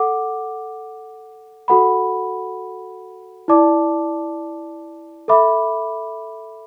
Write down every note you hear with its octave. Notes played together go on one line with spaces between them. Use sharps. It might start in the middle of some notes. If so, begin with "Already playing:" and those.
Already playing: A4 F#5 D6
F#4 A4 F#5 B5
E4 D5 A5 D6
A4 E5 B5 D6